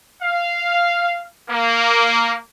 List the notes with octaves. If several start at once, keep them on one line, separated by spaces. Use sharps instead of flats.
F5
A#3